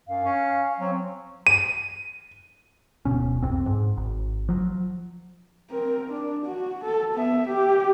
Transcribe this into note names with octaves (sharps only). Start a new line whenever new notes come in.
F#2 F5
C#4
F#3 C4
D#7
D1 C#2 B2 C#4
C2 F2 C4
G#2
G#1
F3 F#3
C4 A#4
D4
F#4
A4
B3 E5
G4